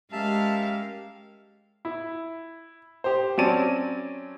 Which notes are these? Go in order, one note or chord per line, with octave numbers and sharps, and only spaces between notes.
G#3 C#4 G4 A#4 E5 F5 A5
E4
G4 C5
F#3 C4 C#4 D5 A5 D#7